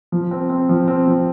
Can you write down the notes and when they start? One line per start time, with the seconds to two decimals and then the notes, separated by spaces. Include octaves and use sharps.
0.12 F3
0.31 C4
0.50 C4
0.69 F3
0.88 C4
1.07 F3